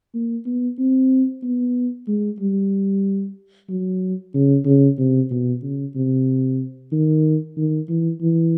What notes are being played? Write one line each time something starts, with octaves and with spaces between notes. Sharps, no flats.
A#3
B3
C4
B3
G#3
G3
F#3
C#3
C#3
C3
B2
C#3
C3
D#3
D#3
E3
E3